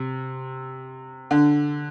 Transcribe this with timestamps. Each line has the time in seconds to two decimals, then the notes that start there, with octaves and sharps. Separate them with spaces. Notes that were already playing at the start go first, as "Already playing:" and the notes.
Already playing: C3
1.31 D3